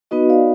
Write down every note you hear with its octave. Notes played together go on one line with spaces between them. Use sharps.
B3 D#4 F#4 B4 D#5
D5 F5